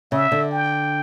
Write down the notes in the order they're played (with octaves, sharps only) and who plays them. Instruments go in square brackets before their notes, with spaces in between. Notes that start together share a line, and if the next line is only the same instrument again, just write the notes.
[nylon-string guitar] C#3 [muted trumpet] E5
[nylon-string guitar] D3
[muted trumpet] G5